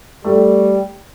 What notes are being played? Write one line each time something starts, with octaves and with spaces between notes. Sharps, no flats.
G3 A3